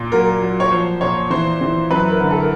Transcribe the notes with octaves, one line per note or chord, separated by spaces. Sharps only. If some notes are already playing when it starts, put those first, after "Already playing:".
Already playing: A#2
F#3 A#4
F#3
C#5
F3 C5
A#2 C#5
E3 C5
E3
F#2 B4
A#4
D3
A4
A#4